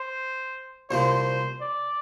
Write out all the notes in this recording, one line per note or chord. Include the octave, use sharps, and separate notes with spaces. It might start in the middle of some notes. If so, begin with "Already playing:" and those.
Already playing: C5
C2 A#2 F3 C5
D5